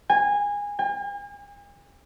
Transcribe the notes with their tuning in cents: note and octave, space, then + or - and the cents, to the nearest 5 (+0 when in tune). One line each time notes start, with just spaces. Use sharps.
G#5 -20
G#5 -45